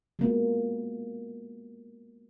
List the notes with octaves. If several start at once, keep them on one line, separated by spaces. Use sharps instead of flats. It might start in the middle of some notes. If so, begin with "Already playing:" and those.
G#3 A#3 B3